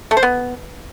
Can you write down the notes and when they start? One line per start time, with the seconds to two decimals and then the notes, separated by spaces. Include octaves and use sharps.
0.11 A3
0.17 C5
0.23 B3